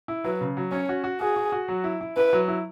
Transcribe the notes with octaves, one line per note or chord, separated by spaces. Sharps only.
E4
F#3 B4
C#3
F#3
C#4 C#5
F#4
F#4
F#4 G#4
F#4
F#4
F#3
E4
E4
E4 B4
F#3
E4